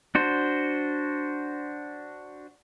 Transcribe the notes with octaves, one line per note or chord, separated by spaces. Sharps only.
D4 F#4 C5